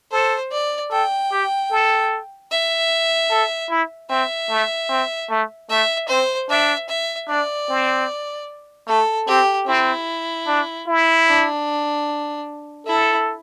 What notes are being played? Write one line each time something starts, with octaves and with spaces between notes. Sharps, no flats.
A4 C5
D5
A4 G5
G4
A4
E5
A4
E4
C4 E5
A3
C4
A3
A3 E5
C4 C5
D4 E5
E5
D4 D5
C4
A3 A4
C4 G4
C4 E4
D4
E4
D4
E4 A4